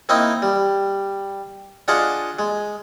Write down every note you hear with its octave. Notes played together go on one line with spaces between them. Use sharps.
A#3 C4 D#4 E4 D#5
G3
D4 F4 G#4 D#5 F#5 A5
G#3